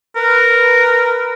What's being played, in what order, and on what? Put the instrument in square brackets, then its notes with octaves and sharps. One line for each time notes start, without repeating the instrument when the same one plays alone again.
[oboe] A#4 [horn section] B4